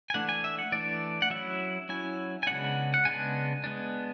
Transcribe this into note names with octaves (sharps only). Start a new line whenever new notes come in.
G#5
E3 A3 D4 F#5
G#5
E5
F#5
E3 A3 D4 D5
F#5
F#3 C#4 E4 E5
F#3 C#4 E4 G#5
G#5
C#3 G#3 B3 D4 F#5
F#5
C#3 G#3 B3 D4 G#5
G#3 B3 D4